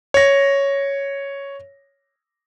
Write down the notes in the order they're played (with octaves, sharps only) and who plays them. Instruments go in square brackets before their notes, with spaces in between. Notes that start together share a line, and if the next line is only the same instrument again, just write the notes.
[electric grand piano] C#5 A#6